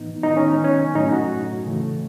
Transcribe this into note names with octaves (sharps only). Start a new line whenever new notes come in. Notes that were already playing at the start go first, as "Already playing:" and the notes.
Already playing: A2 E3 B3 D#4
D#3 G#3 B3 D#4
C#4
C#4
A2 F#3 A3 D#4
F#4
C#3 E3 A3